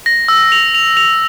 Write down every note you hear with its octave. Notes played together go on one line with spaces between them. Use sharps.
A#6
E6
F7
F7
F7